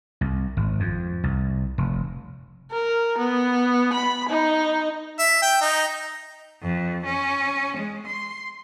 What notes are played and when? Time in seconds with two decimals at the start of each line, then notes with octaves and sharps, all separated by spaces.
0.21 C2
0.57 G#1
0.80 F2
1.24 C2
1.78 F1
2.72 A#4
3.18 B3
3.94 B5
4.29 D#4
5.19 E5
5.42 G5
5.61 D#4
6.61 F2
7.04 C#4
7.76 G#3
8.06 C6